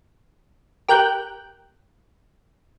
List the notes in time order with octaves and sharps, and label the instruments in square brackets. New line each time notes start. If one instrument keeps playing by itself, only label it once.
[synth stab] G4 A#4 G5 F#6 G6